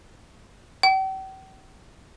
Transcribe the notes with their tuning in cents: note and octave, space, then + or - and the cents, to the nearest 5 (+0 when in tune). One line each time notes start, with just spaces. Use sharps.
G5 -45